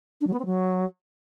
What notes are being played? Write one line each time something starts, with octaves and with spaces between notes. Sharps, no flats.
D4
F#3
B3
C4
F#3